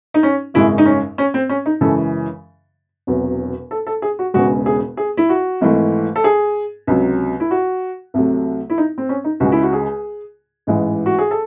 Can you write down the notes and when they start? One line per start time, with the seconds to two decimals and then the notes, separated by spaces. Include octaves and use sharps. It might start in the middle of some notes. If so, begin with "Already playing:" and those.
0.14 D#4
0.23 C#4
0.54 G#1 F#2 C#3 G#3 E4
0.78 D#4
0.86 C#4
1.18 C#4
1.34 C4
1.49 C#4
1.66 D#4
1.81 F#2 C#3 E3 G#3 A4
3.07 E1 E2 C3 F#3
3.71 A4
3.87 A4
4.02 G#4
4.19 F#4
4.34 E1 E2 C#3 G#3 F#4
4.66 G#4
4.97 G#4
5.17 E4
5.29 F#4
5.61 G#1 G#2 E3 A3
6.16 A4
6.24 G#4
6.87 C#2 C3 F#3
7.40 E4
7.51 F#4
8.14 C2 C3 F#3 A3
8.70 E4
8.78 D#4
8.98 C4
9.09 C#4
9.24 D#4
9.40 C#2 C#3 G#3 F#4
9.52 E4
9.63 F#4
9.73 G#4
10.67 A1 G#2 E3 G#3
11.06 F#4
11.19 G#4
11.31 A4